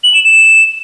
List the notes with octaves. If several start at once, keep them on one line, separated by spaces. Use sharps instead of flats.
F#7
E7
E7